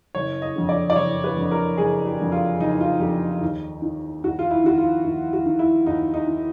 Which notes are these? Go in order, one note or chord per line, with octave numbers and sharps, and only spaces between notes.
F#1 C#5
D#5
F2 D3
D5
D5
F#1 C#5
B4
F2 D3
A#4
F#1 G#4
G4
F2 D3
F4
F#1 D#4
F4
F2 D3 G4
D#2
D#3
D#2 F#4
F4
E4
D#3 F#4
F4
D#2
F#4
D#3
E4
D#2 D#4
D#4
D#3